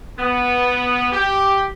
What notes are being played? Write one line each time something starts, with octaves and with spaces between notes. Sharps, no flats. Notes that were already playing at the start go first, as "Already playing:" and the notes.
B3
G4